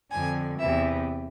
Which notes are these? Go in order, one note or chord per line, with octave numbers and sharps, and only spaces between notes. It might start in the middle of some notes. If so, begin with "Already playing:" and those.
F2 D3 G#5
E2 C3 E3 E5